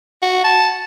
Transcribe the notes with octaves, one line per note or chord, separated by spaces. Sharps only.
F#4
A5